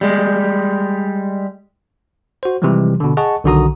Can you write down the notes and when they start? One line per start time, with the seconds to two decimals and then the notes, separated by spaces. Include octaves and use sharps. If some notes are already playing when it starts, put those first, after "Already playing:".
0.01 G3 G#3
2.43 F#4 C5
2.62 C3 E3 F3 G3 G#3
3.00 B2 D3
3.17 G#4 D#5 F#5 A5 C#6
3.44 B1 D3 D#3 F#4 A#5 D#6